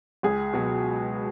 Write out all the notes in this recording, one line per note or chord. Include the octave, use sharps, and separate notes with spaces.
C#2 G#4
B2 F#3